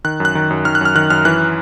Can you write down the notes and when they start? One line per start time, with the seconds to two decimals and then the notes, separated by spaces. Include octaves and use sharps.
0.04 D#3 F#6
0.20 F#2
0.25 F#6
0.35 D#3
0.50 F#2
0.65 D#3 F6
0.75 F#6
0.81 F#2 F6
0.95 D#3 F#6
1.10 F#2 F6
1.25 E3 F#6